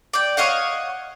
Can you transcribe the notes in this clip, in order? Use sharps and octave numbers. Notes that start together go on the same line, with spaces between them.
D5 G5
C#5 D#5 F5 F#5